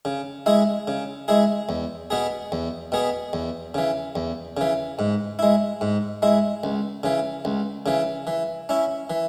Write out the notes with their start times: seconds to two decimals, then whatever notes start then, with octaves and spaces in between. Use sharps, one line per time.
0.05 C#3
0.46 G#3 E4 G#4
0.88 C#3
1.28 G#3 E4 G#4
1.69 E2
2.10 B2 B3 G#4
2.52 E2
2.92 B2 B3 G#4
3.33 E2
3.74 C#3 E3
4.16 E2
4.57 C#3 E3
4.99 G#2
5.39 G#3 E4
5.81 G#2
6.22 G#3 E4
6.64 C#2
7.03 C#3 E3
7.45 C#2
7.86 C#3 E3
8.27 E3
8.69 C#4 E4
9.10 E3